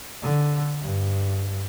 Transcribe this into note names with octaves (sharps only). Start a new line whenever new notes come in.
D3
G2